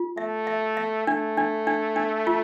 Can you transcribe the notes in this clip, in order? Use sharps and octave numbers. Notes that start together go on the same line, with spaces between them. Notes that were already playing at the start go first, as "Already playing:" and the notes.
Already playing: F4
A3 E5
E5
E5
A3 D4
D4
D4
D4
F4